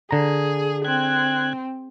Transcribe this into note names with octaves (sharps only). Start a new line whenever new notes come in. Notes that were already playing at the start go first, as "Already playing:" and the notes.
D3 G#4 A#5
C4 F#6 G#6